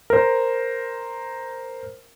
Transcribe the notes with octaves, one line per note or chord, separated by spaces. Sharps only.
A#4 C5